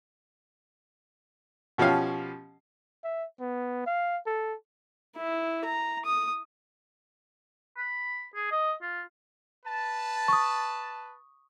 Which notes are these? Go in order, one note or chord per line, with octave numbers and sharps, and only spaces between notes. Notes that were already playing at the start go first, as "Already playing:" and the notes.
B2 F3 C#4 G4 F5
E5
B3
F5
A4
E4
A#5
D#6
B5
G#4
D#5
F4
B4 A5
C#6 D#6